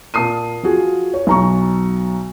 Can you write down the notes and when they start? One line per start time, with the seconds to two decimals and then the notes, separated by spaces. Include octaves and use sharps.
0.14 A#2 A5 D#6 C7 D#7
0.63 F3 F4 F#4 G#4
1.14 C#5
1.27 B1 A#5 C#6